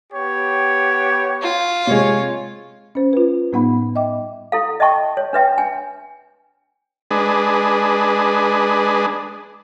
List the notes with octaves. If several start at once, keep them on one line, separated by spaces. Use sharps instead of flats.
B3 G4 C#5
F4
C3 G#3 C#5
C#4 C5
F4 B4
A2 G3 B3 D#4 F#5 B5
D#5 E5 G5 D6
E4 A4 F5
D#5 E5 G5 A5 C#6
C#5
D4 B4 E5 G5
D4 G#5
G#3 D4 G#4 B4